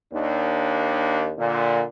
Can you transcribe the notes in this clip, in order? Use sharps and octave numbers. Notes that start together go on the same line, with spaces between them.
D#2 D4
A#2 D3